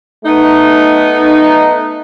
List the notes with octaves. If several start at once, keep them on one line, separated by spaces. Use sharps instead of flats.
A3 B3 D#4